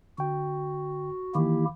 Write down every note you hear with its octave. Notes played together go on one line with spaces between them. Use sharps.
D3 F#4 G5
D#3 E3 A#3 E4 G4